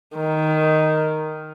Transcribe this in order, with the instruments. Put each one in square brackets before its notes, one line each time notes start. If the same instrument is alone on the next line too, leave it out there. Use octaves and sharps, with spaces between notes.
[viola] D#3